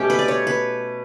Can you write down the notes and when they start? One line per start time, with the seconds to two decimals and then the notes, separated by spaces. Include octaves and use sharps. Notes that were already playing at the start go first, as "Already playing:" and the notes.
Already playing: B2 A3 C#4 G4
0.10 B4
0.19 D5
0.28 C#5
0.47 B4